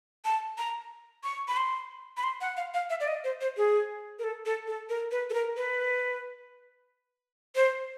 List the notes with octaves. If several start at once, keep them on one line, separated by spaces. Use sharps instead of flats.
A5
A#5
C#6
B5
C6
B5
C6
F#5
F5
F5
E5
D5
D#5
C5
C5
G#4
A#4
A4
A4
A4
A#4
B4
A4
A#4
B4
C5